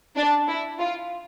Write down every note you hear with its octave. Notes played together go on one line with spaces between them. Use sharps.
D4
E4
F4